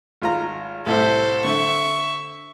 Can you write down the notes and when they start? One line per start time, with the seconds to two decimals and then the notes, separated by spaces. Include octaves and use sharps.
0.22 G#1 F4 A#5
0.86 C2 A2 A4 C5 E5
1.44 D3 E5 C#6